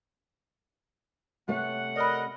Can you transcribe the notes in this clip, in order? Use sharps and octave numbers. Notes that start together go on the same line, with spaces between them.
C3 A3 C#5 F#5
A#4 D5 D#5 B5